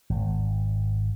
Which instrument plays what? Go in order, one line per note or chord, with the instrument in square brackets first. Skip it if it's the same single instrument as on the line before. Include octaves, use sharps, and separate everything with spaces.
[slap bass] G#1